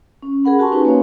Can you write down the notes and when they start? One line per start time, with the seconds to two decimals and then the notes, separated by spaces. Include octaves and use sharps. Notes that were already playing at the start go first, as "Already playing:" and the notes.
0.22 C#4
0.44 G#4 A#4 F#5 B5
0.59 F#4 G4 G#5 A5 C6 C#6
0.72 C#4 D#4 F#4 B4 G#5
0.85 A#3 C#5 F5